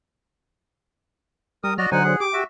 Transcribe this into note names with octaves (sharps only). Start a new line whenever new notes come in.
G3 A#4 D#6
F#3 F#4 D5 D#5 F6
D3 F#3 D#4 C5 F#5 G#5
G#4
G4 D6
F#4 E5